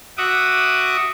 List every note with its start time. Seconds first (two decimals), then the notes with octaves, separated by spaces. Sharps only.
0.18 F#4 E5 F#5 D6 D#6